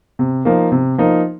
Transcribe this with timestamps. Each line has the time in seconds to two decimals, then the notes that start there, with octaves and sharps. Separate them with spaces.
0.19 C3
0.45 F3 A#3 D#4
0.72 C3
0.98 F3 A#3 D#4